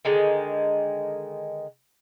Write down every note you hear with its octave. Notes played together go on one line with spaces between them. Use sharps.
D3 D#3 G#3